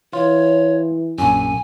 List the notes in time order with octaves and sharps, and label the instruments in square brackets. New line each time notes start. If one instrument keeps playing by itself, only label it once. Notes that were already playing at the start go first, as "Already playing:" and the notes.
[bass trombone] E3 [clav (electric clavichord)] F4 [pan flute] C#5
[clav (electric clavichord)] A#1 F#2 [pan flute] G#5